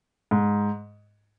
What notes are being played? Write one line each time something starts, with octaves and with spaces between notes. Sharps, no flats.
G#2